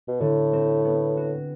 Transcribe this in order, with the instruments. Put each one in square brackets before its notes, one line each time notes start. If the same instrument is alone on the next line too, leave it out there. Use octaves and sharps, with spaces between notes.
[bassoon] B2
[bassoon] A2 [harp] D3
[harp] C4
B3
F#4